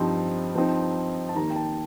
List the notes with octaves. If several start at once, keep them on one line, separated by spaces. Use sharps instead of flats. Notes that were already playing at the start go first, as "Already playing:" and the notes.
Already playing: G2 F3 C4 D#4
G2 F3 C4 D#4
A5
D#2 D#3 A#3 D#4 A#5
G5
A5